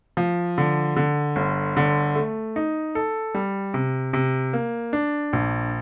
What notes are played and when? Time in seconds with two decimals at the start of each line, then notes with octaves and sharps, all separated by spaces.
0.17 F3
0.58 D3
0.96 D3
1.36 G1
1.77 D3
2.15 A3
2.56 D#4
2.95 A4
3.35 G3
3.74 C3
4.13 C3
4.53 A#3
4.93 D4
5.33 A#1